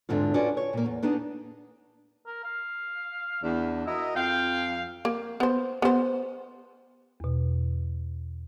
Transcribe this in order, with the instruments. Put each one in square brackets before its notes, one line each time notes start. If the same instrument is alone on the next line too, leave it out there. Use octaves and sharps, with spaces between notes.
[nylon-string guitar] E2 G#2 D3 C4 F4
C#4 F4 F#4 B4 D5
C#5
A#2 A#3
E2
B3 D4 D#4 G#4
[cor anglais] A#4
F5
[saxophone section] E2 D4
[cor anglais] E4 [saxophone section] F#4 A#4 D#5
[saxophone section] F2 F5 [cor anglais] G5
[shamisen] A#3
B3 C5
B3 C5
[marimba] E2 B2